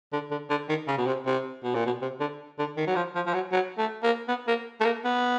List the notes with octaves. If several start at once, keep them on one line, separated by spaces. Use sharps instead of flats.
D3
D3
D3
D#3
C#3
B2
C3
C3
B2
A#2
B2
C3
D3
D3
D#3
F#3
F3
F3
F3
F#3
F#3
A3
A#3
B3
A#3
A3
A#3
B3